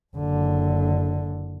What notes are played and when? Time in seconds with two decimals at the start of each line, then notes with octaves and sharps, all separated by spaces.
0.16 F#1 D3